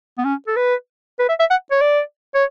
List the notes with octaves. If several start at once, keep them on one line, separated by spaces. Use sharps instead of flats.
B3
C#4
A4
B4
B4
E5
E5
F#5
C#5
D5
C#5